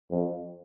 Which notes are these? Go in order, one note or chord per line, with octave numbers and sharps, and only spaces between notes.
F2